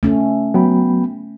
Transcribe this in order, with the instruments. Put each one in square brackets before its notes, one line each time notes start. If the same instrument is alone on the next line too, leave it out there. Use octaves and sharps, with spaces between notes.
[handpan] A3 C#4
[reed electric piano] F#3 [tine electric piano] B3 G5 B5